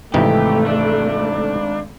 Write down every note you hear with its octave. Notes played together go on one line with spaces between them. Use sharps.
G#1 C3 E3 A3 D#4 G4
D4